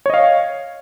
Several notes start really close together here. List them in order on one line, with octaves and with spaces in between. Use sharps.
C#5 D#5 F5